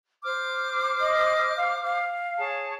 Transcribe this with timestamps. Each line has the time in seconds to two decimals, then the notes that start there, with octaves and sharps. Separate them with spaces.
0.24 C5 D6 F6
1.01 D#5
1.57 F5
1.84 F5
2.38 G#4 C#5 A5